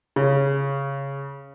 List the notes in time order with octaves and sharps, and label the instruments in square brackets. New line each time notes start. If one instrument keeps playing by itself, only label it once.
[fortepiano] C#3